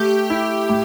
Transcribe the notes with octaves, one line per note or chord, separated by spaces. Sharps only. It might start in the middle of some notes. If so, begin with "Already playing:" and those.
Already playing: A3 G4
E4
A2